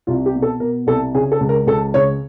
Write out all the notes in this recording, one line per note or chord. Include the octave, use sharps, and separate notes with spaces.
C2 F4
G4
B2
A4
B2 A#4
C2 A4
C#3 G#4
A4
C#2
A#4
C#2 A4
C#3 C#5